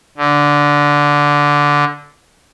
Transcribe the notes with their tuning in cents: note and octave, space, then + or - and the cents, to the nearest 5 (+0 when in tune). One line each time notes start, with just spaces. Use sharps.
D3 -10